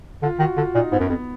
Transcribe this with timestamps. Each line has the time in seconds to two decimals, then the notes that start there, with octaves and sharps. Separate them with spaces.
0.22 D3 F4
0.39 D#3 F#4
0.57 D3 F4
0.75 A#2 D#4
0.92 G#2 B3
1.00 F#2
1.09 F2 B3